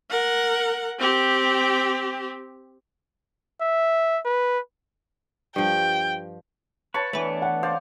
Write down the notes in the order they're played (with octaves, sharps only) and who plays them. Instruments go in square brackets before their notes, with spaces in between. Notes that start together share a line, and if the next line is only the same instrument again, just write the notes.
[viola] A#4 F#5
C4 G4
[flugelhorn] E5
B4
[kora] G2 F3 [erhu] G5
[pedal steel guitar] B4 [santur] C#5 A5 C#6
[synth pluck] E3 B4 [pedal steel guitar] A3 B3 D4
[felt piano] F#5
[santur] C5 D5 F5